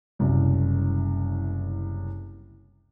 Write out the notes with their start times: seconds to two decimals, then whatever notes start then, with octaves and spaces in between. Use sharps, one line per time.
0.19 F#1 C2 F#2